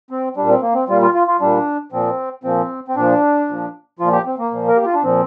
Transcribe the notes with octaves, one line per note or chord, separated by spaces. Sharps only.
C4
A#2 G3 D4
C4
A#3
C4
A#2 G3 F4
F4
F4
F4
A#2 G3 D4
A#2 F3 C4
A#2 F3 C4
C4
A#2 F3 D4
A#2 F3
A#2 F3 F4
G4
C4
A#3
A#2 F3
A#4
G4
F4
D4
A#2 F3 C4